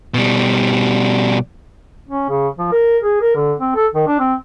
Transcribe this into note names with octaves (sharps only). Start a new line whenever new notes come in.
B2 G3
C#4
C#3
F3
A#4
G#4
A#4
D3
C4
A4
D#3
D4
C4